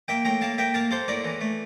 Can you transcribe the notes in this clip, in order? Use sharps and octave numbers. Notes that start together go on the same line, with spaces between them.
A#3 E5 G5
A2 G5 A#5
A#3 F5 A5
A#3 E5 G5
A#3 F5 A5
A#3 A4 C5
A2 A#4 D5
E3
A3